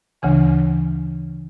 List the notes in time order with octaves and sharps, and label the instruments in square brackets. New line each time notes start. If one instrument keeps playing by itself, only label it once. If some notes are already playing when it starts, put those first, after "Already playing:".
[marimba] D2 C#3 E3 G#5